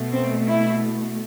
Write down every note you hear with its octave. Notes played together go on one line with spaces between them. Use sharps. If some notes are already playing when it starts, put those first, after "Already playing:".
Already playing: B2 A3
C4
E4